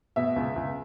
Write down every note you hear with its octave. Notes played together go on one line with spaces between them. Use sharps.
B2 E5
C#2
C#2